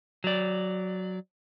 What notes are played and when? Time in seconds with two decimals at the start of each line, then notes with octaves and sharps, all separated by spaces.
0.24 F#3 D5